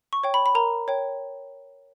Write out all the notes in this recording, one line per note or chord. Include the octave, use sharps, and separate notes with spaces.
C#6
C#5 G5
B5
B5
A#4 A#5
C#5 G5